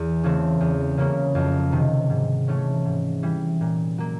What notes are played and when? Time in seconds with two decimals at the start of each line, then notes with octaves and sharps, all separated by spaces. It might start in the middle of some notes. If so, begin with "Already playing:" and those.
Already playing: E2
0.23 C#3 E3 A3 C4
0.60 E2
0.97 C#3 F#3 A#3 C#4
1.35 F2
1.72 C3 D#3
2.10 G#2
2.48 E3 A3 C#4 E4
2.85 G#2
3.23 E3 G3
3.61 A#2
3.98 F#3 A#3